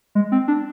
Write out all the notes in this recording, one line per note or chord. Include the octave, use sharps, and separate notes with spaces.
G#3
C4
D4